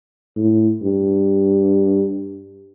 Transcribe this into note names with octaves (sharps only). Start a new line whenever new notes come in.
A2
G2